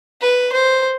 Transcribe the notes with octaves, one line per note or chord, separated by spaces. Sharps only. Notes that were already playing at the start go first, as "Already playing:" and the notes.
B4
C5